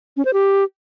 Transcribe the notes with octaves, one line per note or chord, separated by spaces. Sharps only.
C#4
C5
G4